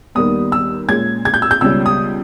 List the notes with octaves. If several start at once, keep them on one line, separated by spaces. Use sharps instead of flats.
D#2 D#3 G3 B3 D#6
E6
A#2 G#3 C#4 G#6
G#6
G6
E6
G6
C#2 B2 G3 C#4 E6
D#6